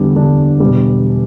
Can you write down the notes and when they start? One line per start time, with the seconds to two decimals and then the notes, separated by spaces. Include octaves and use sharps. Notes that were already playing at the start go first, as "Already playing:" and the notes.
Already playing: E2 D3 G3 D4
0.16 E2 D3 G3 D4
0.60 E1 E2 D3 G3